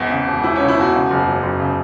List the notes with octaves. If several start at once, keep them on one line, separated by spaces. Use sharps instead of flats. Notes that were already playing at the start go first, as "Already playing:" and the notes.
Already playing: G#1 E2
C#3
E1
E1 E4
C#4
C#3
E4
E1 F#4
C#3
F#1
F#3
F#1
C#3